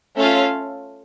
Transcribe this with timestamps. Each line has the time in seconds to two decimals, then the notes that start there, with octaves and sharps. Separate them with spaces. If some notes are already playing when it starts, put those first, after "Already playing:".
0.17 A3 C#4 F4 A4 F5